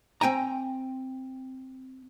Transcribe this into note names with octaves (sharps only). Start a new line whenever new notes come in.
C4 G5 G#5 A#5